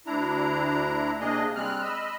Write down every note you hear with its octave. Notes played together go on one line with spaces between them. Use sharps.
D2 D4 E4 A#5
C3 A#3 D4 G#4 D#5
G3 G#3 C4 F6 F#6
D#5 B5 E6